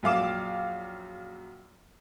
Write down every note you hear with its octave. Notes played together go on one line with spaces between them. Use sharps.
A#1 F#2 F5 D6 E7